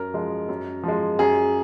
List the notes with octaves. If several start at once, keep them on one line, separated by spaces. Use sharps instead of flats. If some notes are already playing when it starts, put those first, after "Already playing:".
Already playing: F#2 A#4
F3 G#3
F#2
F3 G#3
F#2 G#4